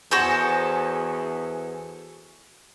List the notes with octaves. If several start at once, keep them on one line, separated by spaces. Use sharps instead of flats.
E2 F#4 G#4 A4 C5 G#5